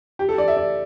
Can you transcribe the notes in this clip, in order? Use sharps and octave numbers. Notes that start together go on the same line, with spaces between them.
G4
A4
D5
E5
D5